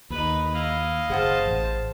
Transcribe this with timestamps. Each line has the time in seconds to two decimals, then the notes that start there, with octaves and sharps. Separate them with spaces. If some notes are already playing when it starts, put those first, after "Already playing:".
0.10 D#2 D#4 B4
0.54 E4 D#5 F5
1.10 F#1 G#4 C5 F#5 A5 F6
1.46 A1